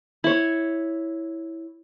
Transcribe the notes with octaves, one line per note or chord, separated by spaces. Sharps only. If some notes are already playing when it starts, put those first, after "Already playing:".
E4 C#5